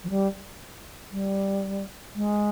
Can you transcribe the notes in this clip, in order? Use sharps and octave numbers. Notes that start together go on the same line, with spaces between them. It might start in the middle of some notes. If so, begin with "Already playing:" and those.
F3
G3
G3
G#3